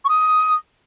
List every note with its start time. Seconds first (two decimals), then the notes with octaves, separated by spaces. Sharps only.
0.04 C#6
0.09 D#6